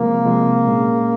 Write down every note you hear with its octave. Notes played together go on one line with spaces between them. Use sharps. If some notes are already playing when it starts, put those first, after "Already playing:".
Already playing: C3 F3 G#3 A#3 C4 F4
C3 F3 G#3 C4 F4
A#2 G#3 C#4 G#4